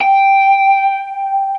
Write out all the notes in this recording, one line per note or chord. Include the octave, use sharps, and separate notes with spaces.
G5